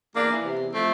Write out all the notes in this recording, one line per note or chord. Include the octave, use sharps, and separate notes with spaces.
E2 A#3 D4
E3
C3
E2
F3 A3 C4